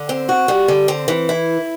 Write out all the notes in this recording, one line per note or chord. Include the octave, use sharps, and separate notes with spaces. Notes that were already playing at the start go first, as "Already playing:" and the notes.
Already playing: D3
C4
F#4
G3
D3
C4
E3
E4